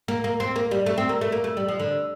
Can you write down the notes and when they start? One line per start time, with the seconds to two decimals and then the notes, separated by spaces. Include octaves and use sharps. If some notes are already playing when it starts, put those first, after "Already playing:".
0.08 A#3
0.24 A#3
0.40 C4
0.56 A#3
0.71 G3
0.86 A3
0.98 C4
1.09 A#3
1.21 A3
1.32 A#3
1.44 A3
1.57 G3
1.68 F3
1.80 D3